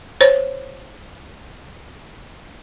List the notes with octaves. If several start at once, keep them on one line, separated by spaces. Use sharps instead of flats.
C5 C#5